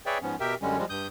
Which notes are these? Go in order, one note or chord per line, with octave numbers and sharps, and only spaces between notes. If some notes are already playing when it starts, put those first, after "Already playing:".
G#4 B4 C#5 D5 E5 G5
G#2 F3 B3 C#4
B2 G4 A#4 E5 G5
F#2 D3 G3 G#3 C#4
F3 G3 G#3
G2 D#6 G6